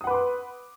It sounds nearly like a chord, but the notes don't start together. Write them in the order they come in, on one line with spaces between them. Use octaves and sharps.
D#6 F#5 B4 D6 C6